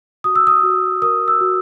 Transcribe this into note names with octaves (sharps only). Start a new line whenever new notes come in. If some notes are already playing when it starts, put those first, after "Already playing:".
F#4 D#6
E6
D#6
F#4
A#4 D#6
E6
F#4